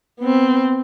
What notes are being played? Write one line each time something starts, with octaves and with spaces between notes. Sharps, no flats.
B3 C4